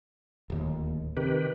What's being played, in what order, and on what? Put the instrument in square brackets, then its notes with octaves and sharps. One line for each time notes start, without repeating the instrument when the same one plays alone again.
[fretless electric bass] D1 D#2
[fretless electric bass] C3 [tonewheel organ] D#3 G4 B4